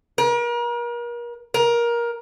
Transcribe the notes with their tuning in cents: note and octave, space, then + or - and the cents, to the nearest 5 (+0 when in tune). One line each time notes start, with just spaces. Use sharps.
A#4 +40
A#4 +20